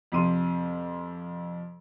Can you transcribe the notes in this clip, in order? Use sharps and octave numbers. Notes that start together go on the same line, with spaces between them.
F2 C3 C6 D#7